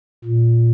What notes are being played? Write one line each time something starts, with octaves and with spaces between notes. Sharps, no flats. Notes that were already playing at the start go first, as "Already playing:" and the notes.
A#2